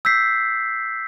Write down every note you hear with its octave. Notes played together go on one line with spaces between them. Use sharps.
E6 G6 B6 C7